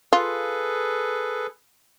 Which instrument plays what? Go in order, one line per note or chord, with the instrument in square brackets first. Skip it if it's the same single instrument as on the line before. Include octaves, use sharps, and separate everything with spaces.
[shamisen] F4 [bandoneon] G#4 A4 B4